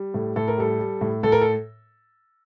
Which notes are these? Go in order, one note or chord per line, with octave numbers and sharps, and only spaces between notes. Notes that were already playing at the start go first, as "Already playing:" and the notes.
Already playing: G3
A2
A2 A4
A#4
G3 A4
G3
A2
A2 A4
A#4
A4